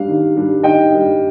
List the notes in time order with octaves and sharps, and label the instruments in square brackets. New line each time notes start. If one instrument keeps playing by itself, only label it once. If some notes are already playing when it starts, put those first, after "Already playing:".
Already playing: [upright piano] G3 D4 F5
D#3
G3 D4
D#3 D#5 G5
G3 D4